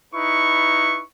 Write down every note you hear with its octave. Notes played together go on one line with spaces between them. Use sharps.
D#4 E4 B4 C#6